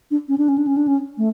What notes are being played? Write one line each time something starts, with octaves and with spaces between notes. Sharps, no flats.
D4
C#4
D4
C#4
D4
C#4
D4
C#4
A3